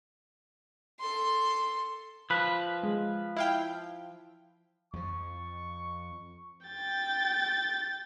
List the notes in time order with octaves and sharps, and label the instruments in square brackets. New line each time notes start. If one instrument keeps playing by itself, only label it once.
[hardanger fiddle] A4 C6
[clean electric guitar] F3 B4 [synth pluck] B5
[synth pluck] G#3
E4 F5 G5
[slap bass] F2 F3 [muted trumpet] C#6
[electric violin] G5 A6